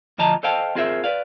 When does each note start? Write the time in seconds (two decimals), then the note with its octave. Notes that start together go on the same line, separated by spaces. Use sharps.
0.18 D2 F3 D#5 A5 A#5
0.43 A4 C5 D#5 F5 G5 A5
0.75 C4 F4 G#4 A#4 C5 E5
1.04 B4 D5 F5